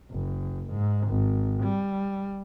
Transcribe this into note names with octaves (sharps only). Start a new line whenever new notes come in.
F#1
G#2
G#1
G3